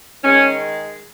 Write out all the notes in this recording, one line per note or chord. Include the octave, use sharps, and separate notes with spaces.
D#3 G#3 C#4